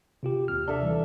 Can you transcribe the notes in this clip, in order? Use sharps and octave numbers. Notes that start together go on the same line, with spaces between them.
C3 F4 G4
D#2 C3 F6
D4 A4 E5
E3 G3